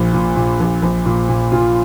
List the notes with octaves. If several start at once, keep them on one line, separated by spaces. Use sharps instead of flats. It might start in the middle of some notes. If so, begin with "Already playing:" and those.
Already playing: A#1 A#2
A#2
A#2
A#1
A#1
A#2
A#2
A#2 F4